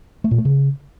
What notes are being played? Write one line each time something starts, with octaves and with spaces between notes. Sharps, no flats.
A3
A#2
A3
C#3